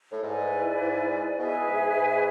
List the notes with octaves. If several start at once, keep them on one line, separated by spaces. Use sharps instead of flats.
A2
G#2 E4 B4 D5 G#5
G#2
B2 G#4 B4 E5 G#5
G#2
G#2